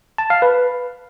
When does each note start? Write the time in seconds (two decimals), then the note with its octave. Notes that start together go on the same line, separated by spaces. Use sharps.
0.18 A5
0.30 F5
0.42 B4